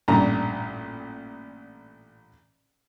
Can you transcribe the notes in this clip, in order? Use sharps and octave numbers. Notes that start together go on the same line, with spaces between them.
A1 G2 A#2 A#5